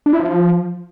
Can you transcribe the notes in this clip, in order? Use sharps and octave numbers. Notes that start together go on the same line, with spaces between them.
D4
E4
F3